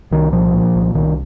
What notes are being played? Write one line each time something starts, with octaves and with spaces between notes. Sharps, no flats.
C2 D#3
A#2 F3
A#2
C2
C2 D#3